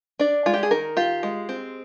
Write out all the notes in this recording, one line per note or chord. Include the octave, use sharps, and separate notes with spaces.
D4 D5
G#3 F4
G4
G#4
D#3 A#4
F4 G4
G#3
C4